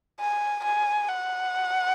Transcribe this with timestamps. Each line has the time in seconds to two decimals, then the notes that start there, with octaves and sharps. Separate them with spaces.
0.20 G#5
0.64 G#5
1.09 F#5